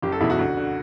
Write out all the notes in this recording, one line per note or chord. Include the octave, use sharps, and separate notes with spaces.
F#1 G4
A4
E2 B2 E4
F#4
D2
D3